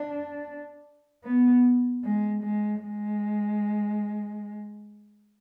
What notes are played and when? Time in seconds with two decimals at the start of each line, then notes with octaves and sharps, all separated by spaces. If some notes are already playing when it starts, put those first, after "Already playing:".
Already playing: D4
1.24 B3
2.04 G#3
2.43 G#3
2.83 G#3